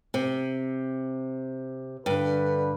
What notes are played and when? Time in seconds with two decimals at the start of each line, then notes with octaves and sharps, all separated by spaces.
0.14 C3
2.06 G2 D3 B4